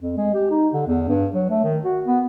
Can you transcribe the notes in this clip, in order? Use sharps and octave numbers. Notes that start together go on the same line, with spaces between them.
F2
G#3
G4
D#4
D3
E2
G2
F#3
A3
D#3
F#4
B3